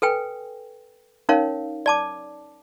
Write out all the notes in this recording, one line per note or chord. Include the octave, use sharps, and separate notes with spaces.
A4 B4 G5 G#5
C#4 D#4 A#4 C#5 F5
D5 A5 D6